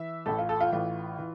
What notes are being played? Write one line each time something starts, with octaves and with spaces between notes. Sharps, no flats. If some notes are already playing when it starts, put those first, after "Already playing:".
Already playing: E3 E5
A1 A2 E3 A4
F4
A4
F4
A1 A2 E3 F4
E3